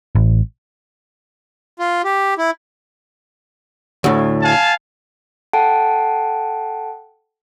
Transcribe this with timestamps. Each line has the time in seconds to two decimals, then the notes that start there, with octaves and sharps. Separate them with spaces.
0.15 A1
1.79 F4
2.05 G4
2.38 E4
4.04 D2 A2
4.42 F5 G#5 A5
5.53 A4 F#5 G5 A5 D7